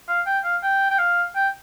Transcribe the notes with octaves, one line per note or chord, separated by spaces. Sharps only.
F5
G5
F5
G5
G5
F5
G5